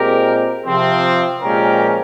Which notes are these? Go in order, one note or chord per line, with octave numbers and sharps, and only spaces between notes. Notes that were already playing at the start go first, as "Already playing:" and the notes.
Already playing: A#2 G#3 C4 G4 A#4
C3 F3 C4
A#2 F3 G#3 C#4 G4 A#4